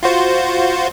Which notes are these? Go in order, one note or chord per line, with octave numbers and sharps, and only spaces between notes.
F4 F#4 C5